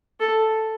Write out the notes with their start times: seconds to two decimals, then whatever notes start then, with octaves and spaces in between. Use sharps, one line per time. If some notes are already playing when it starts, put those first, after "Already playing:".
0.20 A4